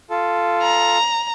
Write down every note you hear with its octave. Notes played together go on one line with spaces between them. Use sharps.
F4 A4
A#5